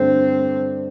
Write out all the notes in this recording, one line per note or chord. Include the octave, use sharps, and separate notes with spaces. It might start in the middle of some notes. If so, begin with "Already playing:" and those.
Already playing: G2 D3 A3 C4